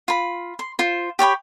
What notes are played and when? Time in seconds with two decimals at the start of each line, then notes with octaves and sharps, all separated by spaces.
0.08 F4 B5
0.59 C6
0.79 F4 C5
1.19 G4 C#5 G5 B5